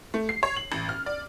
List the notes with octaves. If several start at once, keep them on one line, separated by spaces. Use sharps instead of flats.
A3
C7
C#5
F#7
A1
F6
D5